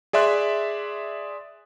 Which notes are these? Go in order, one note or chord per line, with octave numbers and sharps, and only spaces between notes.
G#4 D5 E5 C6 F#6